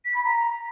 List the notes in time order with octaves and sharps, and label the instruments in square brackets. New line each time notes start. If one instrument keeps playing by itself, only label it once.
[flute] B6
B5
A#5